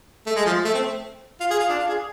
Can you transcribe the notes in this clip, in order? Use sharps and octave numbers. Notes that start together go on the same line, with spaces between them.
A3
G#3
F3
A3
C4
F4
G#4
F4
D4
F4
G#4